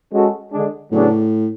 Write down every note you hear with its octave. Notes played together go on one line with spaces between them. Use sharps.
G#3 C#4 F#4 A4
D3 G#3 D4 G#4
A2 C#3 F#3 B3 D4 G#4